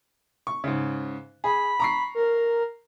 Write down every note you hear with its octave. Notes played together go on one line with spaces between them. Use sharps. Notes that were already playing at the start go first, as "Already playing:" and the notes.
C#6
G#2 C#3
G#4 B5
A#5 C#6 C7
A#4